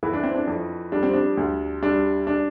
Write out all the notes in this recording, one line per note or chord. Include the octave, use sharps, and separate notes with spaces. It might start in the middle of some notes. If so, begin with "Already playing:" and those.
E3 E4
D4
C4
D4
F2
G3 D4
C4
D4
D2
G3 D4
D4